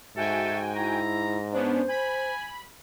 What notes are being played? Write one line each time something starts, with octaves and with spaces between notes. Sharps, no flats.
G#2 F#4 A4 E5 G5 G#5
E4 A#5
B3 C#4 D4 C5
G#5 B5